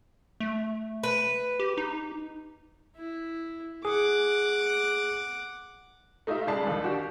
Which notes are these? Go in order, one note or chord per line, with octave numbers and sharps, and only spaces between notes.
A3
B4
G4
D#4
E4
G#4 F#5 D6
A3 D#4 F4 G4 E5
C#3 G3 G#3 D5 A5 C7
A#1 D#2
D4 F#4 G4